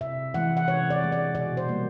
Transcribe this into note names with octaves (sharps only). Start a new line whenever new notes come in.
C3 E5
E3 G#3 F#5
F#5
C3 C#5
D5
E3 G#3
D5
B2 D5
C5
G3 A#3